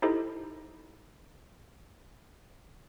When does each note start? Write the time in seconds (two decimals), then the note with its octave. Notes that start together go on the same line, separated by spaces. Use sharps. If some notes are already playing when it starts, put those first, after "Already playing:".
0.02 D#4 E4 G4 A4 C5 D#5